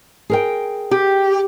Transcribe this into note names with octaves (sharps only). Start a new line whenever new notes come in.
G#4 A#4 G5
G4